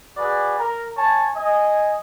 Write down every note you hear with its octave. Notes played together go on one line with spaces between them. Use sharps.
F#4 G#4 B4 D5
A#4 A#5
C#5 G#5 A5
D#5 G#5